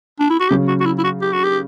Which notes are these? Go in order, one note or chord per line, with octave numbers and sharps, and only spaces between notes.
D4
E4
F#4
C#3 F#3 C#4 G4
F#4
F#4
E4
E4
F#4
G4
F#4
G4